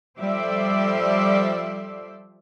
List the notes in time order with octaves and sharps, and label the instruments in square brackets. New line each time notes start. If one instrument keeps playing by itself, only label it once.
[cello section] F3 G3 A4 C5 D5 E5